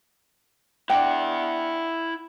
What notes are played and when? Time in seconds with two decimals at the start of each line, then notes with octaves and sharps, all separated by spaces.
0.90 D4 E4 F#5 G5